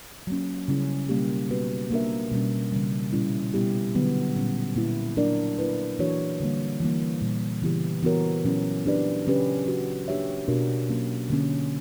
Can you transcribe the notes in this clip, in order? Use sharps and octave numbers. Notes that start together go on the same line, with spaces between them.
F#3 A#3 C#4
C#3 G3 C#4 E4
B2 G3 A#3 C#4 G4
B2 G3 B3 F#4 B4
A#3 D4 A#4 E5
B2 G3 C#4
C#3 E3 G3
A#2 G3 C#4 E4
B2 G3 B3 E4 G4
D3 F#3 B3
A#2 G3 C#4
A#2 A#3 E4
F#3 A#3 D4 A#4 D5
A#3 E4 B4
E3 A#3 D4 F#4 C#5
D3 G3 A#3
E3 G3 A#3
A#2 G3 A#3
C#3 E3 B3 E4 G4
E3 B3 F#4 A#4 C#5
A#2 F#3 C#4 E4
B3 D4 G4 B4 D5
C#3 F#3 C#4 G4 B4
F#3 C#4 F#4
A#3 D4 G4 C#5 E5
B2 A#3 D4 F#4 A#4
F#3 A#3 C#4
D3 A#3 C#4